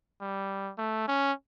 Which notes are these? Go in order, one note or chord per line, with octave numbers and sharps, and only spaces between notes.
G3
A3
C#4